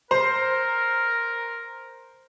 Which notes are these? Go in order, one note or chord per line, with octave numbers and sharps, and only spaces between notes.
A#4 C5